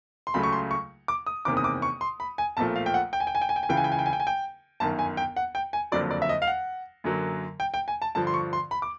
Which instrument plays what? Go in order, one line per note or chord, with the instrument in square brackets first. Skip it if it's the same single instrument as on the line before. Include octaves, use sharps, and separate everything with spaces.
[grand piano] C6
C#2 C#3 F#3 A3 B5
C#6
C6
C#6
D6
D#6
F#1 E2 C3 D#3 D6
D#6
D6
C#6
C6
B5
G#5
B1 A#2 F3 A3 A5
F5
G5
F#5
G5
G#5
G5
G#5
G5
G#5
G5
G#5
C#2 C#3 E3 G5
G#5
G5
G#5
G5
G#5
G5
G#5
G5
G1 F#2 D#3 A5
G#5
G5
F#5
G5
G#5
F#1 F2 D3 F#3 D5
D5
E5
D#5
F5
F#5
F#2 D3 F#3 A#3
G5
G5
G#5
A5
G2 D3 F3 A5
C6
C#6
C6
B5
D6